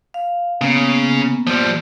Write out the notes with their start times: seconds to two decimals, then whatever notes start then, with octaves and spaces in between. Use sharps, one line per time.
0.14 F5
0.61 C#3 A#3 B3
1.47 F3 G3